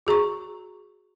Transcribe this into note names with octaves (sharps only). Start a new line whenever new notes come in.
F#4 G#4 A#5 C#6